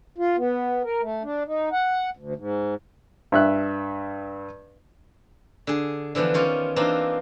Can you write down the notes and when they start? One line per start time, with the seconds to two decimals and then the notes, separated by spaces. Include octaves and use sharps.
0.18 F4
0.37 B3
0.83 A#4
1.01 A3
1.23 D4
1.47 D#4
1.72 F#5
2.17 D2
2.36 G#2
3.32 G2 E5 F#6
5.67 D3 G#4
6.15 D3 E3 F3 B3 D4
6.34 D#3 C#4 F4 C#5 D5
6.76 E3 A#3 C4 D4 D#4 F4